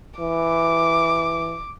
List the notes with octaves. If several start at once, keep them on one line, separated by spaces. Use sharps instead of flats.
E3 D6